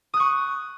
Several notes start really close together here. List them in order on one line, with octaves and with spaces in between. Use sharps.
D#6 F#6 C#6